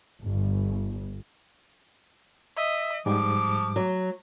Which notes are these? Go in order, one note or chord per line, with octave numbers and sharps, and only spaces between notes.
G1
D#5 E5
G#2 F3 G3 D6
F#3